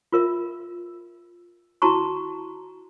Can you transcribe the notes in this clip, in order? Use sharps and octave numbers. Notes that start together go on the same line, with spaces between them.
F4 A#4 E5
E4 F#4 A5 A#5 C#6